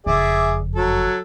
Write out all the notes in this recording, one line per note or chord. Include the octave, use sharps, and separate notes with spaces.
F#1 F2 G#4 D5 E5
F#3 A4